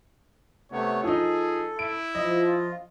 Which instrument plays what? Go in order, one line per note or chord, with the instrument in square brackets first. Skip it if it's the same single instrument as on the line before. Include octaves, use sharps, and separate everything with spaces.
[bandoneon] C3 A3 B3 [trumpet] C#5
[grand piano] F3 D#4 [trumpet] G#4 [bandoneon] A4
[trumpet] E4 [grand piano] D7
[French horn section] F3 [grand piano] D#5
[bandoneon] F4